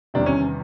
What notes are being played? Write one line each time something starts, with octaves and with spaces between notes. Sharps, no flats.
E2 C3 D#3 G3 D4
C#4